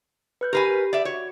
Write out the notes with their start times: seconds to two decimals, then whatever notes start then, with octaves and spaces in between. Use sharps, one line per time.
0.41 B4 F#6 G6
0.53 G4 A#4 B4 G#5 C7
0.93 D5 E5
1.05 F#4 C#5